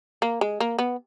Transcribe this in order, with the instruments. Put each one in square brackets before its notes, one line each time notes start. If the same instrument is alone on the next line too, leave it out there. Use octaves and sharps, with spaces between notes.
[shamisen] A#3
G#3
A#3
B3